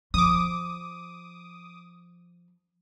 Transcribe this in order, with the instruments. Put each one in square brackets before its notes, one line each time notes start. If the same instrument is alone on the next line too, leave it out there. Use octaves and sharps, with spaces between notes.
[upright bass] F3 [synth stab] D6 D#6